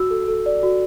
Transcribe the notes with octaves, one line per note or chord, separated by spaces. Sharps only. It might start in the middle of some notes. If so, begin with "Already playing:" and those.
Already playing: F#4 E6
A4
A4
D5
F#4